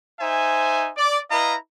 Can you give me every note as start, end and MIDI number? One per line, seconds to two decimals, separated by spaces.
0.20 0.91 63
0.20 0.91 72
0.20 0.91 76
0.20 0.91 80
0.97 1.20 74
1.31 1.55 64
1.31 1.55 71
1.31 1.55 75
1.31 1.55 77
1.31 1.55 82